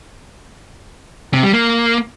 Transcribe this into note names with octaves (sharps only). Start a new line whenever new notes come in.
C3
G3
A#3